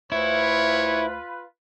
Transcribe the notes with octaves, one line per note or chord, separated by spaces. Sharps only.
D2 E4 F4 B4 C#5